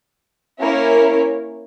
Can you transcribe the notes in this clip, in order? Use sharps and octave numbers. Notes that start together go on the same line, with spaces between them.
A#3 C#4 E4 A#4 C#5